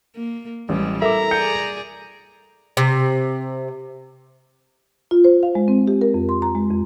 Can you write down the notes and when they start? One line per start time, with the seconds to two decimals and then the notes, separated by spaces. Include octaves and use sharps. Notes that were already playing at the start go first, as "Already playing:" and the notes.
0.15 A#3
0.69 A1 G3 G#3
1.02 E4 A4 A#4 E5 A#5 D6
1.31 G#4 D5 G6 C#7
2.77 C3
5.11 F4
5.24 C5
5.43 F5
5.55 G#3
5.68 C4
5.88 G4
6.01 A#4
6.14 F2
6.29 C6
6.42 A#5
6.55 G#3
6.70 F2